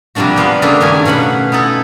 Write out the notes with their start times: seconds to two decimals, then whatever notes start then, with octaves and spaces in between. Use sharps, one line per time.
0.15 C3 F3 G3 A#3 D4 F#4
0.36 C3 B3 C5 F5
0.62 C#3 A3 A#3 D4 G4 A4
0.80 G2 D#3 A3 C#4 A#4 G#5
1.05 B2 C#4 F5 F#5 B5
1.52 B3 D#4 E4 A4